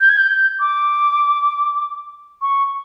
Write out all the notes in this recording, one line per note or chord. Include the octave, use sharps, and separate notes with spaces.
G6
G#6
G6
D6
C#6